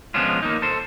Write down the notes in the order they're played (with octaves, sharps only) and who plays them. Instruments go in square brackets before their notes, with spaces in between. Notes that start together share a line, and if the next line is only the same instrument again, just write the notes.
[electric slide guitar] F3 G#3 B3 C#4 D4 F4
A#3 D#4
A4 C5